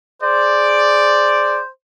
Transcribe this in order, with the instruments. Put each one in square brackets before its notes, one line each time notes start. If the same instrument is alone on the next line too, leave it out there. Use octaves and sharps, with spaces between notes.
[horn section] G#4 D5 [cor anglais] C5